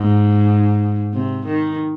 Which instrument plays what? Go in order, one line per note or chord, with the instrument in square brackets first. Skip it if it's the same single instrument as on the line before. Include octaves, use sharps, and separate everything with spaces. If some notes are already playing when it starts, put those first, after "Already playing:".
Already playing: [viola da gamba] G#2
C3
D#3